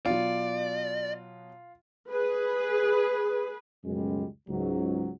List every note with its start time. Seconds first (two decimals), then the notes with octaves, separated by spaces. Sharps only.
0.06 B2 F#3 F4 D5
2.11 G#4 B4
3.84 C#2 F#2 B2 G3 G#3
4.48 C#2 G#2 F#3